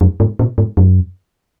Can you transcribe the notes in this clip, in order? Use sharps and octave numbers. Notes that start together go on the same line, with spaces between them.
F#2
G#2
A#2
G#2
F#2